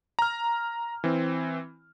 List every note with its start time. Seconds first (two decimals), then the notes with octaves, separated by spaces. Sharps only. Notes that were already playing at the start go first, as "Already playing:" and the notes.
0.19 A#5 F6
1.04 E3 C4